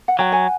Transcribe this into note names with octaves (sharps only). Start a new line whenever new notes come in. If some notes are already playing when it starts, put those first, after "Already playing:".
F#5
F#3 G5
F#5 G#5